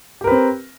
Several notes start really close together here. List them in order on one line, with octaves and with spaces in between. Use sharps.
G4 A#4 B4 C4